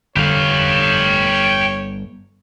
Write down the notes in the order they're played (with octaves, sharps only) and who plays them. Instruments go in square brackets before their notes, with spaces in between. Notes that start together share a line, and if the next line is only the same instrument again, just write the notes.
[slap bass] G1 D3 [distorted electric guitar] G4 F5 [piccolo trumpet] C#5